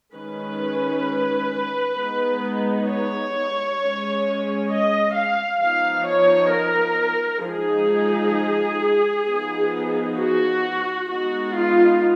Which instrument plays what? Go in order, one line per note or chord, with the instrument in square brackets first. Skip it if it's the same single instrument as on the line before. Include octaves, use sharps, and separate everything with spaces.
[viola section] D#3 G#3 C#4 B4
G#3 B3 D#4
C#5
G#3 C#4
D#5
F5
F3 B3 D#4 F5
C#5
A#4
F3 G#3 D#4 G#4
F3 B3 D#4
F#4
G#3 B3 D#4 F#4
F4